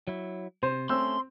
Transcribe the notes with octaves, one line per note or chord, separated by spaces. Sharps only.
F#3 E4
C3 C5
A3 C4 C#4 C6 E6